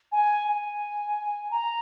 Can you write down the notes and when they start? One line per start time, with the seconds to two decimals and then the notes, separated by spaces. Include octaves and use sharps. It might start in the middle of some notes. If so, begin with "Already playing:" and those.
0.12 G#5
0.48 G#5
1.51 A#5